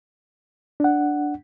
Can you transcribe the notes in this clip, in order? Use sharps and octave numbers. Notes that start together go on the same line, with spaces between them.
D4 F#5